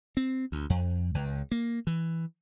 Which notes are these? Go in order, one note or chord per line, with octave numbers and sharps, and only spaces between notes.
C4
D2
F2
C#2
A#3
E3